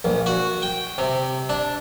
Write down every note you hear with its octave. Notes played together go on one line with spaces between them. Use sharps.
A#1
F#4
G5
C3
D4